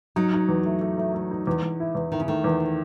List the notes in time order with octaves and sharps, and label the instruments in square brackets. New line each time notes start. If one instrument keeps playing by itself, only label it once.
[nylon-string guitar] F#3 [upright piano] D#4
[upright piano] D#4
E2
A3
A3
A3
A3
D#4
E2
E2
E4
E2
[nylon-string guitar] D#3 [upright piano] E4
[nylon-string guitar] C#3
[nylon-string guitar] D#3 [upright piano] A3
[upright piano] E2